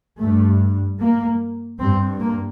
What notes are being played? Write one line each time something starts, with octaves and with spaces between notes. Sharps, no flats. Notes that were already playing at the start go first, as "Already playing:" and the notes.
G2 A3
A#3
G2 C4
A#3